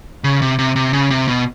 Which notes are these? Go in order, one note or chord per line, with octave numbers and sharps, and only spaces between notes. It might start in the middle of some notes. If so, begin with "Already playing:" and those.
C#3
C3
C3
C3
C#3
C3
B2